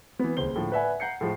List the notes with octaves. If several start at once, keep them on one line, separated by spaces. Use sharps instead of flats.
E3 B3
D#1 C#2 C5 G7
A2 D3 F3
B4 D5 E5 F#5 G#5
F#5 A#5 G6 C7 C#7
A2 F3 G#3